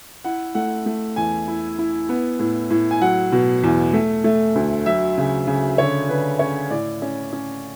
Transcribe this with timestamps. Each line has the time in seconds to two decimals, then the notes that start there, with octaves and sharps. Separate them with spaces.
0.25 E4 F#5
0.55 A3 F#5
0.86 A3
1.16 E2 G#5
1.48 E4
1.79 E4
2.09 B3
2.39 A2
2.71 A2
2.91 G#5
3.01 F#3 F#5
3.32 B2
3.63 E2
3.93 A3
4.24 A3
4.55 D2
4.86 F#3 E5
5.17 C#3
5.47 C#3
5.78 D3 C#5
6.09 D3 B4
6.39 C#4 C#5
6.70 A2 D5
7.02 C#4
7.33 C#4